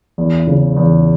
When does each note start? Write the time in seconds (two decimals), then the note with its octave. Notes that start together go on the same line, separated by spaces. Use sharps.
0.18 E2
0.47 C#3
0.77 E2